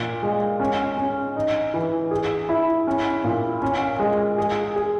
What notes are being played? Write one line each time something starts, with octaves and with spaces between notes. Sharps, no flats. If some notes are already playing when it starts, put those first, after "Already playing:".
Already playing: A#2
G#3
C#4
C#4
D#4
E3
G#4
E4
C#4
A#2
C#4
G#3
G#4
G#4